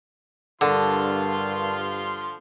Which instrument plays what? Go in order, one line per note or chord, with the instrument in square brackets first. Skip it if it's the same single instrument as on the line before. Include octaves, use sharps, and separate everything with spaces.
[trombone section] G2 [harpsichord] D3 [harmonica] F3 F4 C6 [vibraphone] A#4 A5 C#6